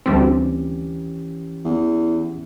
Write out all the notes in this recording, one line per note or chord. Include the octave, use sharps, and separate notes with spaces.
D2 E3 G3 C4 C#4 G4
E2